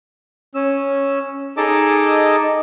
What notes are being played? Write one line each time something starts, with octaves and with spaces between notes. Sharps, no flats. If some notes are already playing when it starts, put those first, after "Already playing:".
C#4 E6
D#4 G#4 A4 D#5 A5 D6